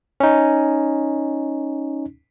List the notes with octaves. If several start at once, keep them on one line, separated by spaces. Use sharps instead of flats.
C#4 D#4